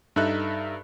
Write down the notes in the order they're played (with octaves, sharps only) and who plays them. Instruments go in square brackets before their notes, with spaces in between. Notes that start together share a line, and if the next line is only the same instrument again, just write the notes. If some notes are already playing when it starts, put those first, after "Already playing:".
[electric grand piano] G2 D#4 A4 E5 F#6